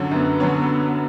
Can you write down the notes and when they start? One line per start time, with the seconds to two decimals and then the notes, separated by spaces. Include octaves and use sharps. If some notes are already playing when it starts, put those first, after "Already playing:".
Already playing: F#2 D3 F#3 C#4
0.11 F#2 B3
0.40 D3 F#3 C#4